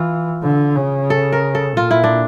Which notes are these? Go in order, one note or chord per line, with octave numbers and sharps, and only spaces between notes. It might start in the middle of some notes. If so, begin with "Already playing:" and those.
Already playing: E3 F4
D3
C#3
A4
A#4
A4
A#2 F4
E4
D4